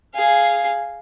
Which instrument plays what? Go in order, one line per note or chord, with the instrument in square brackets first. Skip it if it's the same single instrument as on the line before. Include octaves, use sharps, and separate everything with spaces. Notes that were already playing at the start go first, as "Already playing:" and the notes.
[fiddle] G#4 F5